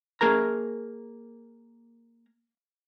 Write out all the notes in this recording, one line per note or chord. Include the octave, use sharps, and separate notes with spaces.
A#3 G#4 A#4 A#5